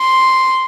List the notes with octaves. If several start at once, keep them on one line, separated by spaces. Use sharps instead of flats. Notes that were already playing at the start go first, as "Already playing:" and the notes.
Already playing: C6